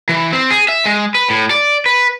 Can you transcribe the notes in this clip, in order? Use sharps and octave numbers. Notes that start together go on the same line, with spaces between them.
E3
C4
G#4
E5
G#3
B4
A2
D5
B4